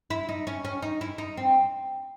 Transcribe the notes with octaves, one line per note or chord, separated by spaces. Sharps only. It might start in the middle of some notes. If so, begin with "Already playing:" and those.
E4
D#4
C#4
C#4
D#4
E4
D#4
C4